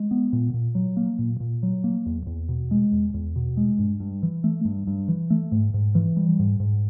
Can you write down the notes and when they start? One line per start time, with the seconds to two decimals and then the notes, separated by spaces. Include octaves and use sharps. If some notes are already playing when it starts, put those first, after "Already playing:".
Already playing: G#3
0.11 B3
0.33 A#2
0.54 A#2
0.75 F#3
0.97 A#3
1.19 A#2
1.40 A#2
1.63 F#3
1.84 A#3
2.06 E2
2.26 E2
2.49 B2
2.71 G#3
2.92 E2
3.14 E2
3.36 B2
3.57 G#3
3.79 G2
4.00 G2
4.23 E3
4.44 A3
4.65 G2
4.87 G2
5.08 E3
5.30 A3
5.52 G#2
5.74 G#2
5.95 E3
6.17 G3
6.39 G#2
6.60 G#2